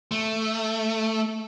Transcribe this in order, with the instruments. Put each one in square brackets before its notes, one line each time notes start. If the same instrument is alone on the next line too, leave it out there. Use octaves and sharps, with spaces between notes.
[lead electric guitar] A3